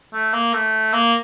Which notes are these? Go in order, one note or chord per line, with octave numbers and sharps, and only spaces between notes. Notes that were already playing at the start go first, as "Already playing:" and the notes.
A3
A#3
A3
A#3